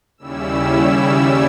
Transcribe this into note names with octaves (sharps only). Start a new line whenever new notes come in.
D#2 C#3 G3 C#4 E4 E6